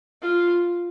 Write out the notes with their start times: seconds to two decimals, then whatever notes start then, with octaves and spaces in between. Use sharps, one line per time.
0.22 F4